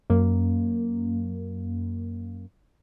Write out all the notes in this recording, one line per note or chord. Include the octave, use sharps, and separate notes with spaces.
F#2 A#3